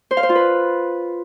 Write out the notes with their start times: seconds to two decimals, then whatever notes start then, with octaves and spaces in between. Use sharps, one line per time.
0.11 C5
0.17 F5
0.23 C5
0.29 F4
0.35 B4